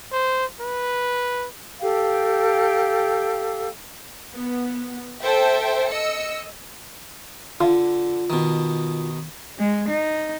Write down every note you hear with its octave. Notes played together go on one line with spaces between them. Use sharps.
C5
B4
G4 A4 F5 G5
B3
A4 C5 E5 G5
D#5 E6 C#7
D3 F4
B2 D#3
G#3
D#4